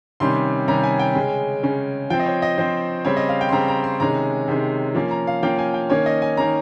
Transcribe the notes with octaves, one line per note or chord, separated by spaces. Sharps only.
C3 D#3 G3 C#4 C6
C3 D#3 G3 C#4 A#5
G#5
G5
C#3 G#3 C#4
C#3 G#3 C#4
F3 C4 G5
D#5
C#5
D#5
F3 C4 C5
C#3 G3 C4 C#5
D#5
F5
G5
C6
C#3 G3 C4 A#5
A#5
C6
C3 D#3 G#3 C#4 A#5
C3 D#3 G#3 C#4
F3 A#3 C#4
A#5
F5
F3 A#3 C#4 G5
G#5
G5
D#3 A#3 C#4 C#5
D#5
G#5
D#3 A#3 C#4 A#5